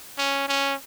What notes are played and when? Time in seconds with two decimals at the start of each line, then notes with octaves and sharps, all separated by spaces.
0.18 C#4
0.48 C#4